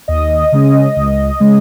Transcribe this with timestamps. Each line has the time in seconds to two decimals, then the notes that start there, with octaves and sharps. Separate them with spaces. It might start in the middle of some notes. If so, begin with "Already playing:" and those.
0.08 D#2 D#5
0.52 C#3 G#3 C#4
0.96 C#2
1.40 C#3 G#3